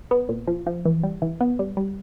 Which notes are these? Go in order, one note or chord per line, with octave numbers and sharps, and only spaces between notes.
B3
A#2
F3
F3
E3
G3
E3
B3
G3
G3